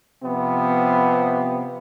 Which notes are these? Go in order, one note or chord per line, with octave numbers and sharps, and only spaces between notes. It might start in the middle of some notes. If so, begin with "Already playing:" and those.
C3 F3 B3